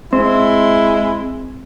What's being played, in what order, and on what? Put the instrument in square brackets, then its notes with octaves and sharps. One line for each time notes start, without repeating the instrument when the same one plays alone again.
[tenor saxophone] G#3 [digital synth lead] C4 [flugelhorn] E4